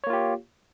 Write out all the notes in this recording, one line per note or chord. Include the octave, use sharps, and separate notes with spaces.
A#3 F4 G4 C#5